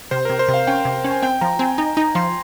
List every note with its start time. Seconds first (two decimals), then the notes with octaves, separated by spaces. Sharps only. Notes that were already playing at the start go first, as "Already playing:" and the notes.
0.11 C3 C5
0.25 C3 A#4
0.39 C5
0.48 C3
0.54 F5
0.67 C#4 G5
0.85 C3
1.04 C#4
1.11 G#5
1.22 C4 G5
1.41 F3 A#5
1.59 C4 G#5
1.78 D#4 A#5
1.97 D#4 A#5
2.15 F3 C6